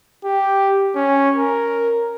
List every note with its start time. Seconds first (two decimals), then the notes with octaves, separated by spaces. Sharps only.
0.24 G4
0.95 C#4
1.36 A#4